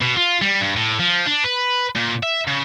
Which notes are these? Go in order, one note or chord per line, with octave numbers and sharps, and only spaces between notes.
B2
F4
G3
G2
A2
F3
D4
B4
A#2
E5
C#3